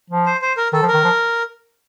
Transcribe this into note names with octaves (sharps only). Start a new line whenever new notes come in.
F3
C5
C5
A#4
D#3 A4
F3
A#4
D#3
F3